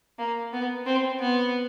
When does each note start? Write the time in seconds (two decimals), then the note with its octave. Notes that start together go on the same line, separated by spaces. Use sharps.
0.19 A#3
0.53 B3
0.86 C4
1.20 B3